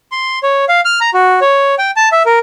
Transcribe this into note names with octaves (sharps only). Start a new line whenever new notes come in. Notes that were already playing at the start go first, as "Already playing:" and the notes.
C6
C#5
F5
F6
A#5
F#4
C#5
G5
A5
E5
A#4